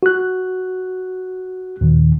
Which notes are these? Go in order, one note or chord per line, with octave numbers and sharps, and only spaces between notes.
F#4 F#6
D#2 A#2 D#3